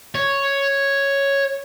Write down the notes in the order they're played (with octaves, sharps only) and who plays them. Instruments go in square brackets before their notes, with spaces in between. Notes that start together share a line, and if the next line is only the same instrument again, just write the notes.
[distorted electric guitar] C#5